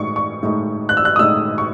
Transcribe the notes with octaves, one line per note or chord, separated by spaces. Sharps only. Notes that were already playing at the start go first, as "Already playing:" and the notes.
Already playing: A2 G#3 D#4 C#6
C#6
A2 G#3 D#4
F#6
E6
F#6
D#6
A2 G#3 D#4 E6
C#6